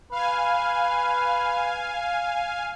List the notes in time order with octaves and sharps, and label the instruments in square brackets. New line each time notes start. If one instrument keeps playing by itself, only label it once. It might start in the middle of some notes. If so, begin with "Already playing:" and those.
[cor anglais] B4 [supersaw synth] F5 G#5